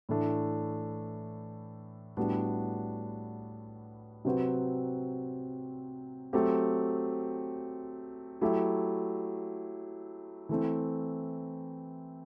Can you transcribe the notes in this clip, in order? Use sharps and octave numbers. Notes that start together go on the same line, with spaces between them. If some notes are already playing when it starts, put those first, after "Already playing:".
A2 E3 A3 D4
A2 G3 B3 D4 F#4
C3 F#3 C4 F#4 B4
F#3 A3 C4 G4
F#3 A3 E4 G4
E3 A3 C4